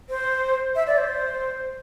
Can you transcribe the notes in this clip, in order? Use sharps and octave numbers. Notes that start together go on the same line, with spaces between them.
C5
E5
D5
C5